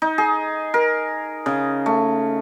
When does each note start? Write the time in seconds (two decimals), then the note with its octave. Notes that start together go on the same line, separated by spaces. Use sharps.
0.02 D#4
0.18 G#4
0.74 A#4
1.46 C#3
1.86 A3